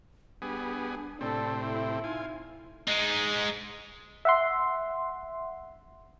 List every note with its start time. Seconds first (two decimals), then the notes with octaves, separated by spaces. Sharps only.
0.42 G3 B3 D4 G#4
1.21 A2 C3 C4 A4 D5
1.63 E4 A4
2.04 D#4 F4 G#5
2.87 G#3 D#4
4.25 E5 F#5 C6